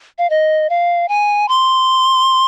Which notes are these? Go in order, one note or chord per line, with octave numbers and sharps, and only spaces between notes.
F5
D#5
F5
G#5
C6